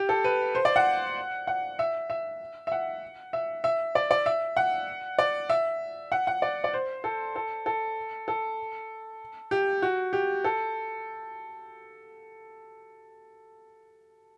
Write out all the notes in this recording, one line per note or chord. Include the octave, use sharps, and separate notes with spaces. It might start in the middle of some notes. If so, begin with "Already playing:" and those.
Already playing: G4
A4
B4
C5
D5
F#5
F#5
E5
E5
E5
F#5
E5
E5
D5
D5
E5
F#5
D5
E5
F#5
F#5
D5
D5
C5
A4
A4
A4
A4
G4
F#4
G4
A4